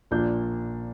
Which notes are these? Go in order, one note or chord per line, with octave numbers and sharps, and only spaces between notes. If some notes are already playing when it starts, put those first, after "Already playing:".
A#1 A#2 A#3 D4 G6